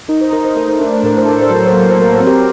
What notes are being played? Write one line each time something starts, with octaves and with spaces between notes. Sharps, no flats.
D#4 A#4
C5
D#4 A#4
C5
A3 A#4
C5
D4 A#4
C5
A2 A#4
C5
A4 A#4
C5
F#3 A#4
C5
A#3
A#4
C5
F#3 A#4
C5
C4
G4 A#4